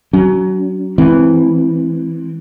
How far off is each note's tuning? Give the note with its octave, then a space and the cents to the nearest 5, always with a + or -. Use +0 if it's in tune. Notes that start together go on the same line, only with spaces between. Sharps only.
F#3 +20 C#4 +40
E3 +0 G#3 +30 C4 +0